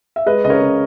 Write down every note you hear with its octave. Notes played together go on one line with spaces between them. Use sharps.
E5
G#3 B4 D#5
C#3 D#5
A#4 C#5
C#3